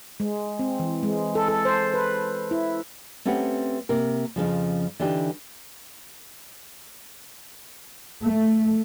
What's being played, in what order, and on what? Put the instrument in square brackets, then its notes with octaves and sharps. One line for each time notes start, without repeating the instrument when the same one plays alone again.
[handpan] G#3
C4
E3
G#3
A4
A4
C5
B4
E4
[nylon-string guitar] A3 C4 C#4 G4 B4 F#5
C3 A#3 A#4
F2 A#2 C#3 F3
D3 E3 D4 D#4 G4
[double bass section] A3